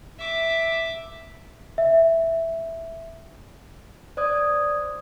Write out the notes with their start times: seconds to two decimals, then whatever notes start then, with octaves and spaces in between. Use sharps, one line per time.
0.19 E5 D6
1.78 E5
4.17 C5 D5 D#6 G#6